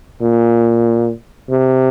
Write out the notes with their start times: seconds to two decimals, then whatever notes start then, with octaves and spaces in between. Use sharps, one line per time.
0.21 A#2
1.49 C3